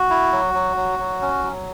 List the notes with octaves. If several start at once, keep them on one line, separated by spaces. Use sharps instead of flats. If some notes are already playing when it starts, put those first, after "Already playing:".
Already playing: F#4
E4
F#3
F#3
F#3
F#3
C#4
F#3